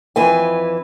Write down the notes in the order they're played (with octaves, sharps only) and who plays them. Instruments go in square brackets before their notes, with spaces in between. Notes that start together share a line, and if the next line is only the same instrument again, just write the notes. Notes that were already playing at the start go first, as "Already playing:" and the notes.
[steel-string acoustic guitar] F2 E3 B4 G#5